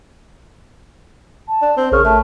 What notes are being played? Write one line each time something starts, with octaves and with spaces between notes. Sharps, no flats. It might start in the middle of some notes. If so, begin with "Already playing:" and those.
A5
D4
C4
A1 C#3 A#4 C#6 F6
A3 A5